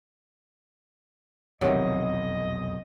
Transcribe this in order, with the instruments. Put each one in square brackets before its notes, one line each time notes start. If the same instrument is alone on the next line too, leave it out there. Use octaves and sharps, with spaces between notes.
[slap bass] F1 B1 E2 [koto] C3 D#3 F#3 [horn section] D#5